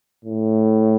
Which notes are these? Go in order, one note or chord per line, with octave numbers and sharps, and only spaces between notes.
A2